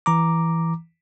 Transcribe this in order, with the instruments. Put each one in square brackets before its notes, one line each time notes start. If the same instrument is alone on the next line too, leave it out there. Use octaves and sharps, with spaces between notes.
[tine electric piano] E3 A#5 D6